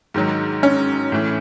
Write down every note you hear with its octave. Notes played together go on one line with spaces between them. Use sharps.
G#2 D#3 F#3
C#4
A2 E3